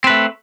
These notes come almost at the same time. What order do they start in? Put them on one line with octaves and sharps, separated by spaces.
C4 B4 A3